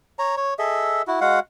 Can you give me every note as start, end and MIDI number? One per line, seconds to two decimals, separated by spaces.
0.19 0.35 73
0.19 0.35 82
0.37 0.54 73
0.59 1.02 68
0.59 1.02 69
0.59 1.02 75
0.59 1.02 76
1.07 1.20 64
1.07 1.20 66
1.21 1.39 56
1.21 1.39 66
1.21 1.39 77
1.21 1.39 78